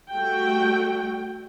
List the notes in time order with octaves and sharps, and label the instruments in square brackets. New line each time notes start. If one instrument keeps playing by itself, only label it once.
[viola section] G3 A3 F#4 G5